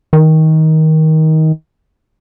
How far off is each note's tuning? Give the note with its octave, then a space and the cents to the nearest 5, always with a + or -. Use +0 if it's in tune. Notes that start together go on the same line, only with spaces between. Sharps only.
D#3 +20